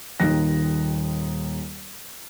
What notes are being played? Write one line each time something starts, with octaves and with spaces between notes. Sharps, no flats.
D#1 D#2 D#3 D#4 F#6 A#6